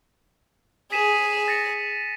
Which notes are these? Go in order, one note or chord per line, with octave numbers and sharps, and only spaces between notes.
G#4 B6 D#7 E7
A6 A#6 C#7